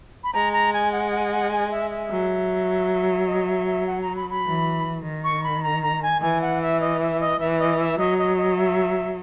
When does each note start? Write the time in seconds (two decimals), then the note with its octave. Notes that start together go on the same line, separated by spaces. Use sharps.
0.24 B5
0.33 G#3 A#5
0.53 A#5
0.73 G#5
0.92 F#5
1.12 F#5
1.31 F#5
1.51 G#5
1.71 E5
1.91 E5
2.10 F#3
3.27 D#5
3.47 E5
3.67 E5
3.87 F#5
4.01 A#5
4.16 B5
4.30 B5
4.45 E3
5.04 D#3
5.24 C#6
5.44 B5
5.63 A#5
5.83 A#5
6.03 G#5
6.22 E3 G#5
6.41 F#5
6.62 E5
6.81 D#5
7.00 E5
7.20 D#5
7.40 E3 E5
7.59 D#5
7.79 E5
7.98 F#3 D#5
8.18 D#5
8.38 D#5
8.57 E5